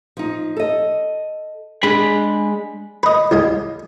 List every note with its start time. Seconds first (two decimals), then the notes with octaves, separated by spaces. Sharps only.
0.17 F3 D#4
0.57 A4 D#5
1.83 G#3 D4 G#4 B5
3.03 B4 D#5
3.31 C2 G#3 G#5